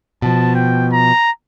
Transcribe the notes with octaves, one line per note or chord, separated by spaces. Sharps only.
B2 F3 A5
G5
A#5